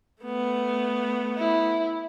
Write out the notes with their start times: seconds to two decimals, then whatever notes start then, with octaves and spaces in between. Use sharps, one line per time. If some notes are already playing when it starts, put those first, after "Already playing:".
0.23 A3 B3
1.38 E4